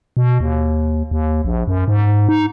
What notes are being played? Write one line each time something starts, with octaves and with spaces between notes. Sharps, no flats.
B2
D#2
D#2
A#1
F#2
G#2
D#4